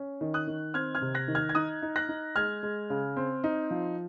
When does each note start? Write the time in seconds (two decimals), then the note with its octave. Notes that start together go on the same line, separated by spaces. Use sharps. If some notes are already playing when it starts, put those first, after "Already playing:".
Already playing: C#4
0.21 D#3
0.34 D#6 F#6
0.47 D#3
0.74 C4 F6 G#6
0.95 F6 G#6
1.01 C3
1.14 F#6 A#6
1.28 D#3
1.35 F6 G#6
1.49 G#6
1.55 D#4 D#6 F#6
1.82 D#4
1.96 F#6 A#6
2.09 D#4
2.36 G#3 F6 G#6
2.63 G#3
2.90 C#3
3.17 C4
3.44 D#4
3.71 F3